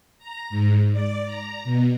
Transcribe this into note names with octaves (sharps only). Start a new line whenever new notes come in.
A#5
G#2
D5
A#5
B2